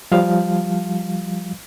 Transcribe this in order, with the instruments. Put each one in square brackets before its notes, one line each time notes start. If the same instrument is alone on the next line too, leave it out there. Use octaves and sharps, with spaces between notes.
[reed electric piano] F3 G3 F5